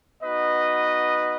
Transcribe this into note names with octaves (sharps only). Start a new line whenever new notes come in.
B3 D#4 F#4 B4 D#5